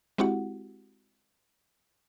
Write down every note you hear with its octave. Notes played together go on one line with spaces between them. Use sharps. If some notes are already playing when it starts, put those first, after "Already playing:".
G#3 C4 E4 F#4 G4 F#5